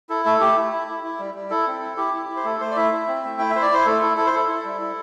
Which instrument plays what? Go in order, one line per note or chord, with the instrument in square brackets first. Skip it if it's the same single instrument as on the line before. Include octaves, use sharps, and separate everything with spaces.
[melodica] E4 A4
A3 A4
A3 G4
E4
E4
E4
E4
G3
G3
E4 A4
C4
E4
E4 G4
E4
E4
C5
A3 A4
A3 C5
D5
E4 E5
E4
C4
A3
E4 G5
E5
E4 C5
D5
E4 C5
A3 A4
E4 A4
E4 A4
C5
E4 A4
E4
G3
E4